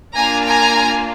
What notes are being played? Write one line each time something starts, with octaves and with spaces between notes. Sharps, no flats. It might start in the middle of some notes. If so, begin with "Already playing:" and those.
A#3 D4 F4 G#5 A#5
G#5 A#5